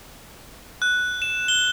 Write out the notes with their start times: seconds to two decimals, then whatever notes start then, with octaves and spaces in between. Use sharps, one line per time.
0.82 F#6
1.22 E7
1.48 G7